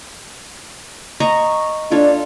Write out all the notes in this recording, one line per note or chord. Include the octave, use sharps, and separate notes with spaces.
D#5 A#5 C#6
D4 F4 A4 C#5